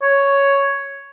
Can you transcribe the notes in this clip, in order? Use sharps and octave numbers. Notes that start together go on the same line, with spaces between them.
C#5